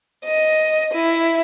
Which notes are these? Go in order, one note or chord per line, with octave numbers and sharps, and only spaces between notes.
D#5
E4